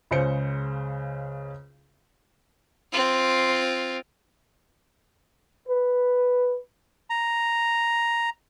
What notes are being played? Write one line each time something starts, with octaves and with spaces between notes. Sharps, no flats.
C#2 C#3 C5 C#7
C4 F4
B4
A#5